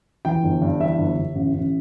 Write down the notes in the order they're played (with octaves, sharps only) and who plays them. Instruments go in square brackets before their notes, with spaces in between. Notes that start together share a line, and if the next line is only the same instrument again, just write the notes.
[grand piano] E3 G5
G1
G2
E3 E5
G1
G1
A1
A1